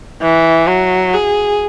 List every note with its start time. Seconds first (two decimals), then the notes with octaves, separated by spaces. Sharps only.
0.22 E3
0.67 F#3
1.14 G#4